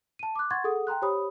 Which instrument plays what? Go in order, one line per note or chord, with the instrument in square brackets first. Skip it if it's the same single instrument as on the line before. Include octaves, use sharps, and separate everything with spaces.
[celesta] A5 D#7
D6 F#6
F#5 C6 C#6 G#6 A6
G#4 A4 F#5 D#6
G5 A#5 C6 F#6
G4 C5 C#5 B5 D#6